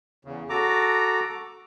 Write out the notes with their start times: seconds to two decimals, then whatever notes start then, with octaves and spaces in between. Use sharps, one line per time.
0.25 E2 C#3
0.49 F#4 A4 A#5 D6